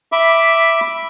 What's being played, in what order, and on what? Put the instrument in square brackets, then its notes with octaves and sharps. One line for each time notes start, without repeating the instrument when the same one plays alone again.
[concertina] E5 B5 D6